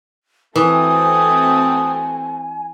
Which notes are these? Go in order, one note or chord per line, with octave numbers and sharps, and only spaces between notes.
E3 A3 C4 F#4 G#5 D#6